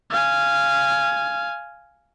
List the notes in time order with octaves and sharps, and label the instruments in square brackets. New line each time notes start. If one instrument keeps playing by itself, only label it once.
[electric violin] F5 G#5